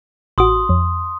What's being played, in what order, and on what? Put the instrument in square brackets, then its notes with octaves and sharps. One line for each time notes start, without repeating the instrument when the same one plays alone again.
[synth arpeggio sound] A1 F#4 [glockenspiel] C6 D#6
[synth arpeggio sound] F2